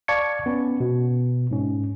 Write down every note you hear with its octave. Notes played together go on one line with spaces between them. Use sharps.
D5 F5 A5 C#6 G#6 C#7
B3 C#4
B2
G#2 C#4